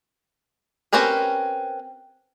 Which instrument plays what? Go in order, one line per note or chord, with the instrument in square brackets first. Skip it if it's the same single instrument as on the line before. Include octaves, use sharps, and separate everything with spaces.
[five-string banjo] C4 C#4 G4 A#4 B4